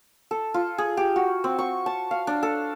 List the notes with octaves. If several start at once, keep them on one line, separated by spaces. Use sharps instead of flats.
A4
F4
G#4
G4
F#4
C4
C#6
A5
F5
D4
A4